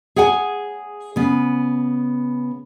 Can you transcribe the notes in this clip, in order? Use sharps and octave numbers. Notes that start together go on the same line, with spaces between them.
G#4 C#5 F#5 G#5
C#3 B3